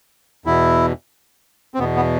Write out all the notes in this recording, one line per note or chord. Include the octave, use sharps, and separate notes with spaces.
E2 B2 E4
C4
E2 B2 B3
B3